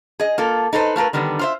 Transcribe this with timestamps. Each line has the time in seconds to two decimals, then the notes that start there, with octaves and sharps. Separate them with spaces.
0.19 G#4 D#5
0.38 A#3 F4 A4
0.73 D#4 A4 B4 C5
0.96 A3 F4 A#4 B4
1.13 D3 D#3 G3 B3
1.39 F4 C5 E5